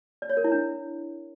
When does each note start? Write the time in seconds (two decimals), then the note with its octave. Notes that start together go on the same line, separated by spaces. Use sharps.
0.22 D5
0.29 C#5
0.37 A#4
0.44 E4
0.52 D4